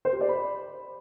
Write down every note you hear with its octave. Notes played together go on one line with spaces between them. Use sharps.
C5
G4
D5
B5